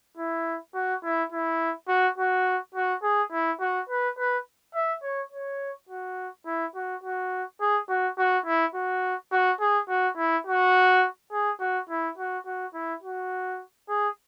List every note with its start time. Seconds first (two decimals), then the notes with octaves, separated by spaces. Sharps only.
0.17 E4
0.75 F#4
1.03 E4
1.32 E4
1.88 F#4
2.18 F#4
2.74 F#4
3.03 G#4
3.32 E4
3.60 F#4
3.89 B4
4.18 B4
4.74 E5
5.03 C#5
5.32 C#5
5.89 F#4
6.46 E4
6.75 F#4
7.03 F#4
7.60 G#4
7.89 F#4
8.18 F#4
8.46 E4
8.74 F#4
9.32 F#4
9.60 G#4
9.89 F#4
10.17 E4
10.46 F#4
11.32 G#4
11.60 F#4
11.89 E4
12.18 F#4
12.46 F#4
12.74 E4
13.03 F#4
13.89 G#4